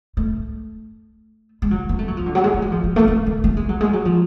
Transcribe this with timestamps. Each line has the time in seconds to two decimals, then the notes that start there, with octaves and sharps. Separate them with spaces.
0.17 A3
1.62 G#3
1.71 F#3
1.89 B3
1.99 A3
2.08 F#3
2.17 F3
2.26 D3
2.35 F#3
2.44 G#3
2.54 A3
2.62 G#3
2.72 F3
2.84 F3
2.96 A3
3.08 A3
3.26 A3
3.44 A3
3.57 G#3
3.69 F#3
3.81 G#3
3.93 F#3
4.05 F3